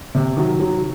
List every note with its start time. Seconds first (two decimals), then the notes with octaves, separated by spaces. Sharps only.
0.15 C3
0.37 D#3 F#3
0.60 F#3